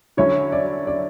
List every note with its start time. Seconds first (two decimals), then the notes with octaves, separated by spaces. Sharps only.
0.17 D3 F#3 C#4 E4 C#5
0.52 D5
0.87 D5